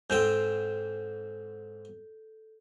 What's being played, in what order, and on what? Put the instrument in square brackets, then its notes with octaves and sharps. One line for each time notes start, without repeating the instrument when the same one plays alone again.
[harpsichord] G#2 C4 G5 [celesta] A4 G6